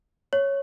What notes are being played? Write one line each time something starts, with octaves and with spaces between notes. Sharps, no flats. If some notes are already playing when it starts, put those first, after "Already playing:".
C#5